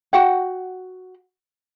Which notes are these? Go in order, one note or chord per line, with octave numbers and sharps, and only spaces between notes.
F#4 F#5 G5